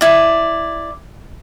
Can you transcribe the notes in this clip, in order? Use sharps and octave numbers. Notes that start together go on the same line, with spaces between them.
E4 D5